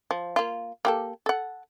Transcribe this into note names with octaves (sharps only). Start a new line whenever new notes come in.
F3
A#3 F4
A#3 G4 A4
A4 F#5